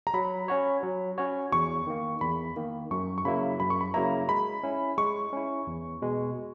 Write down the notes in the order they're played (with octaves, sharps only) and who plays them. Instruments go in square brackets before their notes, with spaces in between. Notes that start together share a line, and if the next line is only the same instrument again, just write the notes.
[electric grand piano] A#5
[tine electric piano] F#3 [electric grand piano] B5
[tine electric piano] C#4 F#4 C#5
F#3
C#4 F#4 C#5
[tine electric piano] E2 [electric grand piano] C#6
[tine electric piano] D#3 A#3
[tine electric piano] E2 [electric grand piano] B5
[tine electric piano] D#3 A#3
[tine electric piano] F#2 [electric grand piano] C#6
[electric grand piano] C#6
[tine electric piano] C#3 F#3 A#3 E4 [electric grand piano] B5
[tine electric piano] F#2 [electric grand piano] B5
[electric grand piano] C#6
B5
[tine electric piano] C#3 F#3 A#3 E4 [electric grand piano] A#5
[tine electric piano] G#3 [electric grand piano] B5
[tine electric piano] C#4 E4
[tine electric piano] G#3 [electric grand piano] C#6
[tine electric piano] C#4 E4
E2
B2 G#3